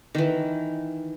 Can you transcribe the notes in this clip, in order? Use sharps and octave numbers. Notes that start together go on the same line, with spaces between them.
D#3 E3